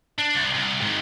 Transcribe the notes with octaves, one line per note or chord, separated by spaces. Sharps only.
D4
C2
C2
G#2 D#3